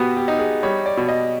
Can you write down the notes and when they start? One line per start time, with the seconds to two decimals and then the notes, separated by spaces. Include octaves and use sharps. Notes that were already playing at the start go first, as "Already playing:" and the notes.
Already playing: B2 B3 F#4 G4
0.17 G4
0.28 D#4
0.39 G#4
0.63 G3 C#5
0.86 D5
0.97 B2
1.08 D#5